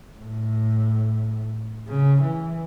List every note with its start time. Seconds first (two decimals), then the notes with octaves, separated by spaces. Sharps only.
0.19 A2
1.88 C#3
2.23 E3